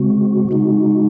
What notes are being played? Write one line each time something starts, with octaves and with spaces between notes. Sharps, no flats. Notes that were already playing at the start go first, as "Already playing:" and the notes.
Already playing: C#3 G#3 C4 F#4
C#3 G#3 D#4 F#4